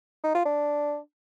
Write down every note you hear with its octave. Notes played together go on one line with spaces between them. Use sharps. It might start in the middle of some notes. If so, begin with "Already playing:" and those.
D#4
F4
D4